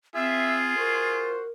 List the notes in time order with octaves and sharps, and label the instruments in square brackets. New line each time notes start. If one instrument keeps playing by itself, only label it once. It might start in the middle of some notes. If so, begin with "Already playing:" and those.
[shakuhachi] C4 [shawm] F4 [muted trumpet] G#4 [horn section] E5
[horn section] F#4 C5 [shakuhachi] A#4